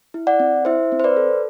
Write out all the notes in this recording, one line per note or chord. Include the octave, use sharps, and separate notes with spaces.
E4
D5 F#5
C4
E4 C5 E5
C4
C5
B4 D5
A4